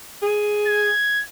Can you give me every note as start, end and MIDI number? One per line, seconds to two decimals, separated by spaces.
0.22 0.90 68
0.67 1.23 92